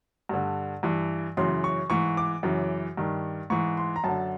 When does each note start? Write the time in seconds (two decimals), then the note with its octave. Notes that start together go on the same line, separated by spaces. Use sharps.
0.29 G2 D3
0.83 G2 E3
1.37 F#2 C#3 E3 C6
1.64 C#6
1.90 G#2 E3 C#6
2.17 D6
2.43 F#2 C#3 E3
2.97 G2 D#3
3.50 G#2 E3 C#6
3.77 C6
3.96 A#5
4.04 F#2 D3 A5